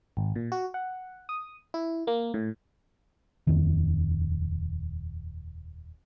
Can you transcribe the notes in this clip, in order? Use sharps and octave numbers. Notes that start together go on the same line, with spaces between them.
G#1
A#2
F#4
F#5
D#6
E4
A#3
A2
D#1 F2 D#3